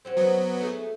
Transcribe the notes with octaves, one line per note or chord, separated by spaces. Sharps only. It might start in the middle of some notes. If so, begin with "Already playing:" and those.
C4 C#4 F#4
F#3 B3
A3 D#4 G#4